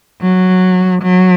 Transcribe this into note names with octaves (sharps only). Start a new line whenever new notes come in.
F#3
F#3